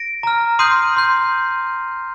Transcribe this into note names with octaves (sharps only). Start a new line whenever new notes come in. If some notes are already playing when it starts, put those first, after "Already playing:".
Already playing: A#6 D7
A#5 F6
C6 D#6 G6 C7 D#7
C6 G6